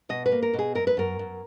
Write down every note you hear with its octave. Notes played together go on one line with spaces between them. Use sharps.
B2 D#5
B4
A#3
A#4
B2
G#4
F#2 A#4
B4
F#2 A#4
F#2